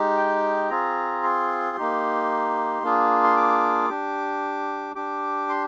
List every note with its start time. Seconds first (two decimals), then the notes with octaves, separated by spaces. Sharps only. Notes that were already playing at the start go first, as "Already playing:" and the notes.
Already playing: G#3 D#4 G4
0.17 G5
0.70 C4 F4 G#4 A#5
1.23 C6
1.77 A#3 D#4 G4
2.83 A#3 D4 F4 G#4
3.24 C6
3.37 D6
3.89 D4 G4
4.95 D4 G4 D6
5.49 C6